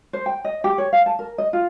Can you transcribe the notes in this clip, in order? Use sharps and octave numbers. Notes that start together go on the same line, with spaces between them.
C5
G5
D#5
G4
C#5
F5
A5
A#4
D#5
F4